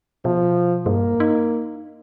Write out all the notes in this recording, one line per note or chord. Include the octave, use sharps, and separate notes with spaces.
B2 F3
G2 A#3
D#4